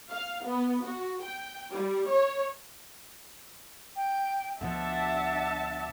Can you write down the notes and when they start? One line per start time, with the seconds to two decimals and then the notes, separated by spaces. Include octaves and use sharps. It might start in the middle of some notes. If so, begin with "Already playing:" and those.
0.11 F5
0.45 B3
0.85 F#4
1.24 G5
1.71 G3
2.12 C#5
3.96 G5
4.61 D2 B2 F3 D4 E5 F#5 A5